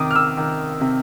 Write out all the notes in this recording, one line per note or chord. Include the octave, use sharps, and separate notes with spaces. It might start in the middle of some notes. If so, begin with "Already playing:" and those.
Already playing: C3 D#3 D6 D#6
F6
E6
D#3
C3